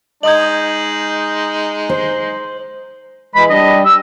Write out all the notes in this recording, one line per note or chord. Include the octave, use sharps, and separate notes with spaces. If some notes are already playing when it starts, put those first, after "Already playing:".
G#3 D#4 D#5 D#6 G6 G#6 F#7
C5
E3 G#3 B5
G3 D4 D#5
E6